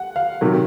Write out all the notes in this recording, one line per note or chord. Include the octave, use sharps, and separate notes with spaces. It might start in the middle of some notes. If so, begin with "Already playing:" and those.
Already playing: F#5
F5
C3 D#3 F#3